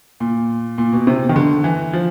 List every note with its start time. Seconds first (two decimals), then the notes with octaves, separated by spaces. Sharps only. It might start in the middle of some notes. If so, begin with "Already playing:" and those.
0.20 A#2
0.78 A#2
0.93 B2
1.07 C3
1.29 D#3
1.36 D3
1.64 E3
1.93 F3